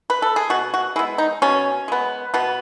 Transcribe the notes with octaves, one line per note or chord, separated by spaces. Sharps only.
B4
A4
G#4
B2 F#4
F#4
G#3 B3 E4
D#4
B2 C#4
G#3 B3
B2 B3